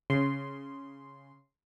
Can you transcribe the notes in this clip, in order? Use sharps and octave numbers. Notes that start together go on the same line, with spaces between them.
C#3 C6